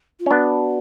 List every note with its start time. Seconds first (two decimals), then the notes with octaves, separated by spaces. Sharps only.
0.20 F4
0.26 C#4
0.31 B3 D4 F#4